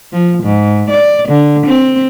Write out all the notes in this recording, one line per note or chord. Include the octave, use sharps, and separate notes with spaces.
F3
G#2
D5
D3
C4